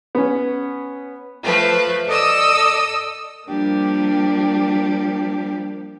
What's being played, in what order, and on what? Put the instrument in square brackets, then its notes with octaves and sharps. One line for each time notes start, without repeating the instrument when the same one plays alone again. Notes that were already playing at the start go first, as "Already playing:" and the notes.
[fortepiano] B3 C#4
[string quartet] F3 A3 B4
A4 D5 D#5 D#6 E6
F3 G3 A#3 D4 G4